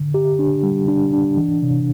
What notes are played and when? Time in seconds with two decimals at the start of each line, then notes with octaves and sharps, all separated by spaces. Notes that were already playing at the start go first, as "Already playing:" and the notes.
Already playing: D3
0.14 G4
0.39 D4
0.63 G3
0.88 D4
1.13 D4
1.37 E3
1.62 C3